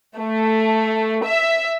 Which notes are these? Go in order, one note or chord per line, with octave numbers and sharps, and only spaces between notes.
A3
E5